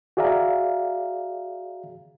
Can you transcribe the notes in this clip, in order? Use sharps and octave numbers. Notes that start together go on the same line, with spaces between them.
F#4 G#4 D5 E5 F5 A#5